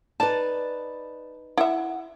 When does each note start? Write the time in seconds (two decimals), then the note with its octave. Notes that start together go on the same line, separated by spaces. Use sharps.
0.20 D#4 B4 D5 A5
1.57 E4 E5 F#5